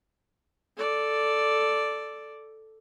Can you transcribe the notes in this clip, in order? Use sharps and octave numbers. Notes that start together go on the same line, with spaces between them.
A4 D5